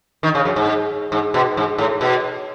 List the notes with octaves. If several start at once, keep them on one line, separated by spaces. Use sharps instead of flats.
D#3
C#3
F#2
G#2
G#2
B2
G#2
A2
B2